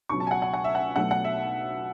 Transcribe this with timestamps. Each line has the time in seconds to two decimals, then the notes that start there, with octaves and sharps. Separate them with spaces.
0.09 C#2 B2 F#3 C#6
0.20 A5
0.27 G#5
0.31 F#5
0.42 F#5
0.53 F#5
0.64 E5
0.75 F#5
0.96 B1 B2 F#3 A3 F#5
1.11 F#5
1.24 E5